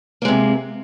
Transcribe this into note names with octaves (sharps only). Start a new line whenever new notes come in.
C3 G#3 A#3